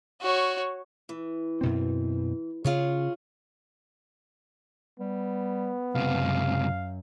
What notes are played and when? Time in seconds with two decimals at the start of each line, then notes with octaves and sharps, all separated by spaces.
0.21 F#4 C#5
1.09 E3
1.61 F#2 B2 C4
2.64 C#3 F4 G#4 C#5
4.99 G3 B3
5.95 C#2 F#2 C3 F5